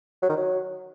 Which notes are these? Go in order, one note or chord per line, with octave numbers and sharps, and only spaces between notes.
F#3
D#3
F#3